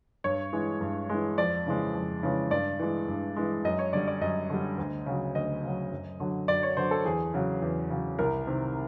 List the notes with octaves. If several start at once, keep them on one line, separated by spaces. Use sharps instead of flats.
G2 C#5
E3 G#3
G2
E3 G#3
F2 D5
C#3 E3 G#3
F2
C#3 E3 G#3
G2 D5
E3 G#3
G2
E3 G#3
F#2 D#5
C#5
D3 G3 D5
D5
F#2 D#5
D3 G3
D2
C#3 F#3
D2 D#5
C#3 F#3
F#2
D3 F#3
F#2 D5
C#5
D3 F#3 C5
A4
E2 G#4
C#3 F#3
E2
C#3 F#3
C2 A#4
C3 D#3